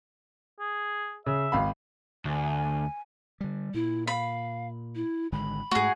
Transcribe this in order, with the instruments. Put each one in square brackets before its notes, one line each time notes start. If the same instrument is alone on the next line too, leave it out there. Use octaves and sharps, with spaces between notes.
[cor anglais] G#4
[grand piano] C#3 [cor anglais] E5
[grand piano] G#1 F5 B5
[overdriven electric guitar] D2 [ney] G#5
[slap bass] D3 G3
[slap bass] A#2 [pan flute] E4
[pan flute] F5 [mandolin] B5
[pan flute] E4
[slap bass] G#1 D3 G#3 [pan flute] B5
[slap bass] G#2 A3 [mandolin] F#4 G#4